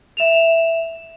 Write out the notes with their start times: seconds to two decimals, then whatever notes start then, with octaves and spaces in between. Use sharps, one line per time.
0.17 E5 E7 F7